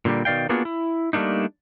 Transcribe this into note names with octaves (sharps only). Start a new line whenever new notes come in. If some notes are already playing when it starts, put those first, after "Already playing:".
A#2 D3 F#3 G3 A#3
B2 D#3 D5 F5 G5
A#3 B3 D4 F4 F#4 G#4
E4
G3 A3 A#3 D4 D#4